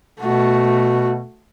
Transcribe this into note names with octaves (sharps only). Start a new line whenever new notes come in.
B2 A3 F#4